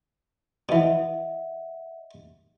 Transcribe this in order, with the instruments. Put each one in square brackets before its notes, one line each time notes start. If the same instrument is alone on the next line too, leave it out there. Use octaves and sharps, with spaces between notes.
[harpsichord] B2 E3 [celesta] D#5 E5 F#5